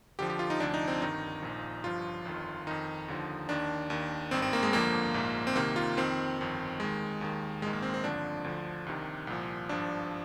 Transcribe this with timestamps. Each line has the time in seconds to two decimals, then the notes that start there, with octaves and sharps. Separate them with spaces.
0.19 F2 D3 F3 G4
0.30 G4
0.39 F4
0.50 D#4
0.60 D2 C3 F3 D4
0.74 D#4
0.88 C4
1.01 G1 G2 D#3 D#4
1.42 A#1 A#2 F3
1.84 G1 G2 F3 F4
2.25 G1 F2 D#3
2.67 F2 D#3 D#4
3.08 D#2 D3 F3
3.49 D#2 D#3 D4
3.90 D#2 D#3
4.31 G#1 G2 D#3 C4
4.42 C4
4.53 A#3
4.63 G#3
4.73 G1 F2 D3 F3 A#3
5.14 A#1 G#2 F3
5.47 C4
5.56 C2 C3 D#3 A#3
5.76 F4
5.97 F2 D#3 C4
6.39 G1 F2 D#3
6.80 D#2 D#3 G#3
7.21 D#2 D#3
7.62 A#1 G#2 D#3 G#3
7.73 A#3
7.82 C4
7.94 C4
8.04 G1 F2 D3 F3 D4
8.44 D2 D3 F3
8.86 C2 C3 D#3
9.27 C2 A#2 F3
9.69 G#1 G2 F3 D4